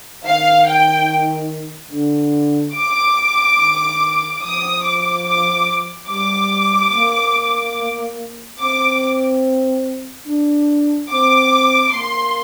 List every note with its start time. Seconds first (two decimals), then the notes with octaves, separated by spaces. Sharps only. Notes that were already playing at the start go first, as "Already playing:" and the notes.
0.25 D#3 F5
0.66 G5
1.91 D3
2.75 D6
3.58 D#3
4.42 F3 D#6
4.84 D6
5.25 D6
6.09 G3 D6
6.92 A#3
8.59 C4 D6
10.26 D4
11.09 C4 D6
11.93 A#3 C6